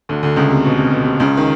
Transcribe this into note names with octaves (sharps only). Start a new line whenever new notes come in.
D2 D3
D2 D3
C#2 C#3
C3
B2
C3
B2
C3
C#2 C#3
D#3